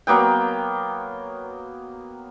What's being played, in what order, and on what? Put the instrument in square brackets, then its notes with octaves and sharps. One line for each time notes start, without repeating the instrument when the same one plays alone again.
[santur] F#3 A#3 B3 G5